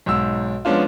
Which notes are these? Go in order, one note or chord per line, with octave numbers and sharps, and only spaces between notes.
B1 G#2 E6
F3 G#3 B3 C#4 D4 F4